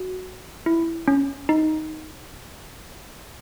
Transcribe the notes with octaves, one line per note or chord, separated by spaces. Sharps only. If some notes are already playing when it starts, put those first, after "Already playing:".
Already playing: F#4
E4
C#4
D#4